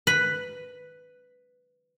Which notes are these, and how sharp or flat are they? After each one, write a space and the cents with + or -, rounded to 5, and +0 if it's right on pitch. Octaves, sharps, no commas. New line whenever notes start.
B4 +5 B5 +0